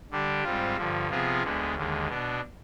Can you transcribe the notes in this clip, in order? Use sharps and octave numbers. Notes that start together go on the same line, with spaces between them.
D3 G3 D4 G4
G#2 G3 C4 F4
G2 D3 F3
C3 F3 B3 F4 G#4
D2 D3 G#3 B3
D#2 D3 G#3
B2 B3 D4